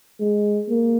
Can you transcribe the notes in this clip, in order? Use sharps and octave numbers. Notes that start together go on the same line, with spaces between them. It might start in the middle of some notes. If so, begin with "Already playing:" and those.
G#3
A#3